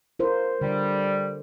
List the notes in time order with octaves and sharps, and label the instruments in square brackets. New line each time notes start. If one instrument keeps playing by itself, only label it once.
[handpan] F4 A#4 C5
[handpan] D3 [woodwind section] G3